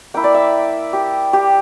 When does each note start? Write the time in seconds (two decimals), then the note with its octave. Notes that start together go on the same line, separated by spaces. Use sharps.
0.14 A#3 E4 G5
0.24 D5
0.34 E5
0.93 G4
1.33 G4